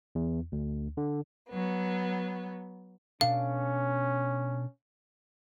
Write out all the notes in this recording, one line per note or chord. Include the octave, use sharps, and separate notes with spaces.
E2
D2
D3
F#3 B3
B2 C#4 D4 A4 F5